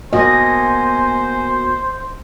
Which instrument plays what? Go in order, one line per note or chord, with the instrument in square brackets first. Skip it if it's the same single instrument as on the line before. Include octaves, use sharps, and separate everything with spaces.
[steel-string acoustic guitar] B2 A#3 F#4 [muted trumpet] C5 [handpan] D#5 [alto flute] G#5